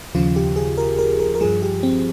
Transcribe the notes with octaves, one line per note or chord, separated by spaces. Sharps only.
D#2 C#3 F3 F4
G4
G#4
A#4
A#4
A#4
A#4
G2 F3 G#4
G4
C4